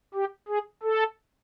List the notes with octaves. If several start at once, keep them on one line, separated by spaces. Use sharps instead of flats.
G4
G#4
A4